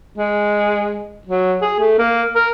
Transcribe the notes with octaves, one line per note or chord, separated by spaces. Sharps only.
G#3
F#3
G#4
A3
A#3
A#4